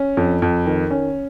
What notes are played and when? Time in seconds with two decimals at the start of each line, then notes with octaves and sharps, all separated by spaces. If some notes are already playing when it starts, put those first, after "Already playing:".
Already playing: C#4
0.17 F2
0.42 F2
0.66 D#3
0.91 C#4